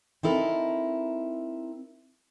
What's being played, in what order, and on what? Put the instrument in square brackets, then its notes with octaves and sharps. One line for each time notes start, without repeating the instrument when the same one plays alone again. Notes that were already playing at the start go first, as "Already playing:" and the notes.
[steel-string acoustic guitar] C4 D#4 E4 A4 A#4